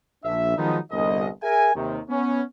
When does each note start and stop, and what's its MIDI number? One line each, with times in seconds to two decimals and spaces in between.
0.24 0.57 34
0.24 0.57 62
0.24 0.57 76
0.58 0.79 51
0.58 0.79 53
0.58 0.79 54
0.58 0.79 56
0.58 0.79 59
0.58 0.79 63
0.92 1.28 31
0.92 1.28 36
0.92 1.28 75
1.42 1.73 68
1.42 1.73 70
1.42 1.73 76
1.42 1.73 80
1.75 2.00 39
1.75 2.00 48
1.75 2.00 51
2.09 2.42 59
2.09 2.42 61